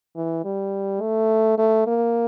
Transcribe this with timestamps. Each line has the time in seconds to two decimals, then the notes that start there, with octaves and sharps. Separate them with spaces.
0.16 E3
0.44 G3
1.01 A3
1.58 A3
1.87 A#3